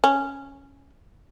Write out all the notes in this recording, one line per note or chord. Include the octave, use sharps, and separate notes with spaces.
C#4